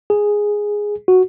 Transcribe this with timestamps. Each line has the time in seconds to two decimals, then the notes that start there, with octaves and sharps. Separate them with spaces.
0.10 G#4
1.08 F#4